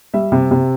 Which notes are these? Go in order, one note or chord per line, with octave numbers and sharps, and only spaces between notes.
G3 E5
C3
C3